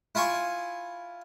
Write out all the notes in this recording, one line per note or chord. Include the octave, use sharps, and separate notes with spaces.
E4 F4 G#5 C#6